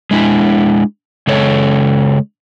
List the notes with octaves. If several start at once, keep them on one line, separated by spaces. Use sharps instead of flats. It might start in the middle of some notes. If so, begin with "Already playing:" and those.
G#3 D4 E4
C#3 G#3 A4 C#5